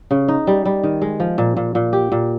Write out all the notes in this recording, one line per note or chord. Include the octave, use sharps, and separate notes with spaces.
C#3
D#4
G3
G3
D#3
G#3
F3
A#2
A#2
A#2
G4
A#2